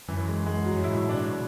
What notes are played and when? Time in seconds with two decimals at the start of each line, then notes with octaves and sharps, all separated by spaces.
0.08 F#2 E3
0.28 G#3
0.46 G#3
0.65 F#3
0.72 F#2
0.83 G#2 E4
0.94 B2
1.02 A2
1.09 D4
1.16 A2
1.21 B2